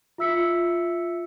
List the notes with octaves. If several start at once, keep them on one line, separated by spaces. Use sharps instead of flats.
F4 E5 E6 B6 C#7